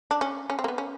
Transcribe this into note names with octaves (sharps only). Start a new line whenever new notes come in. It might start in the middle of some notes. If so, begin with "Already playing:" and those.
D4
C#4
C#4
C4
A#3
B3
C#4